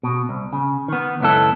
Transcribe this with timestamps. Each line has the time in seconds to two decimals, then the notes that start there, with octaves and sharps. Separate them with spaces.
0.03 B2
0.29 C2
0.53 C#3
0.88 D#3 B3
1.20 C#2 F#2 B3 E4 A4